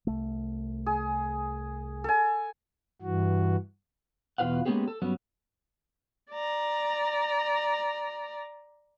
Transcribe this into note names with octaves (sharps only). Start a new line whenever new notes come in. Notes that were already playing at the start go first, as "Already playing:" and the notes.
C2 A3
G#4
A4 G#5
G2 E3 F#4
E2 B2 F4 B4 F5 F#5
G#3 A#3 B3 C#4 G4 G#4
A4
G2 F#3 G3 B3 C#4
D5 A#5